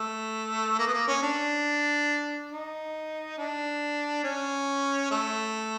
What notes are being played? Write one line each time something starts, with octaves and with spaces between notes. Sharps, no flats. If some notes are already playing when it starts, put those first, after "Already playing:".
Already playing: A3
A#3
B3
A#3
C#4
D4
D#4
D4
C#4
A3